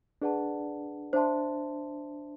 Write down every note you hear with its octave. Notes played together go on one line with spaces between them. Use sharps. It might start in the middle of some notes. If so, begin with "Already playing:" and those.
D4 G#4 B4 D5 F#5 A5
D4 C5 E5 A5 C6